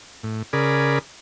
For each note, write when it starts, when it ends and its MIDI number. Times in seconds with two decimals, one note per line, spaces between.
0.23 0.42 45
0.53 0.99 49
0.53 0.99 68
0.53 0.99 70
0.53 0.99 74
0.53 0.99 83